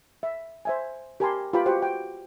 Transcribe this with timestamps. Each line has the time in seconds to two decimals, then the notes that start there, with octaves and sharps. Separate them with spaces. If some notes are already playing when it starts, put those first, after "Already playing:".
0.23 E5
0.65 C5 E5 G#5
1.20 G4 A#4 G#5 A5 B5 C6
1.53 F4 G4 B4 G5 B5
1.66 F#4 G4 C5 D#5 F#5
1.82 G5